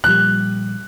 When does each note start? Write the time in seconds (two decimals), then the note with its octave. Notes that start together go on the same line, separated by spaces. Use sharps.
0.04 A#2 F3 G3 F#6